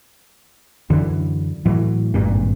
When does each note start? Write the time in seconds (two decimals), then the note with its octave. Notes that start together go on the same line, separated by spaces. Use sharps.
0.90 F#2 D3 E3
1.66 A2 E3 F#3
2.14 G#1 G2 A#2